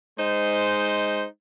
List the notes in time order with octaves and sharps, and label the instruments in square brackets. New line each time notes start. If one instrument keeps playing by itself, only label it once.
[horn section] G#3 D#4 C5